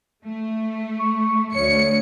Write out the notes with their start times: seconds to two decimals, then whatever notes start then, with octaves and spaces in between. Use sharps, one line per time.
0.25 A3
0.99 C#6
1.55 D2 C#5 C#7